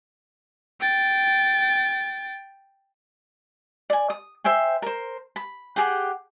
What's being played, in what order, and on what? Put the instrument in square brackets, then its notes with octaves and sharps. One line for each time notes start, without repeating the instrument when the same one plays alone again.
[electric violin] G5 A6
[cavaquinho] D5 G#5
D#6
C5 E5 G5 G#5
A#4 C5
B5
G4 G#4 F#5 G5